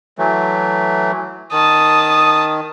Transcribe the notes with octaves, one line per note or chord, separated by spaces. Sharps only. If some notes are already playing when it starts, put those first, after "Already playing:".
E3 F#3 A3
D#3 A5 D#6